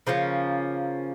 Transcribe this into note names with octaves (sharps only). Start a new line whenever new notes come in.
C#3 F3 A#3 C#4